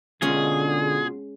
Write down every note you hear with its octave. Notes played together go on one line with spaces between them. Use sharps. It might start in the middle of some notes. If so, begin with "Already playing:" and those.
B2 D3 G#3 C#4 F4 G#4